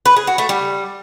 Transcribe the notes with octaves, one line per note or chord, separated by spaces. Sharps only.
B4
G#4
F#4
A3
G3